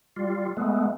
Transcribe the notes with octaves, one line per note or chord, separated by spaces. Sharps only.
G3 F4
G#3 A3 B3